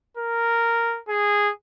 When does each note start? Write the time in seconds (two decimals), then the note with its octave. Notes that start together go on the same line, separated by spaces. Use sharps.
0.17 A#4
1.09 G#4